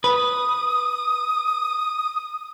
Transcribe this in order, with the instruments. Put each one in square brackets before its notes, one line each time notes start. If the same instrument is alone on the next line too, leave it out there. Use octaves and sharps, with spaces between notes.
[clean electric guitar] B4 [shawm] D#6